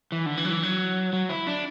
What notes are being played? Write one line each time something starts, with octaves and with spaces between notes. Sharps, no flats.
E3
D3
E3
F#3
E3
F#3
F#3
E4
D4